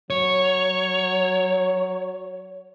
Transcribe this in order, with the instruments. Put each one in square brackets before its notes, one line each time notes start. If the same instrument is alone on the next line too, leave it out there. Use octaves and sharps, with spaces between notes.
[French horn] F#3 [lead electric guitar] C#5